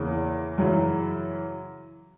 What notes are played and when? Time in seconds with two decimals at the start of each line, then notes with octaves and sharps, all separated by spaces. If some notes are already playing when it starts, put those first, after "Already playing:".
Already playing: E2 C#3 E3 A#3
0.58 F#2 C#3 E3